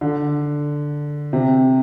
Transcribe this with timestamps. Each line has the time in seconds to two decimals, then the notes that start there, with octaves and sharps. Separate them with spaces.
0.01 D3
1.33 C3